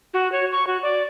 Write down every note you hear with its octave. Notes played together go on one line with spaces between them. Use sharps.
F#4
C#5
C#6
F#4
D5